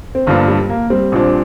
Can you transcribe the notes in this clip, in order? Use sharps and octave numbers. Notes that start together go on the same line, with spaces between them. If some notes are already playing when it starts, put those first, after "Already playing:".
C4
G1 G2 F3 A#3 D4 F4
G3
A#3
G3 C4
A#1 A#2 F3 D4